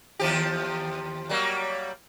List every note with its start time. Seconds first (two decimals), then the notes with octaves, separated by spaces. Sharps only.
0.19 D#2 F3 G4
1.29 F#3 G3 A#3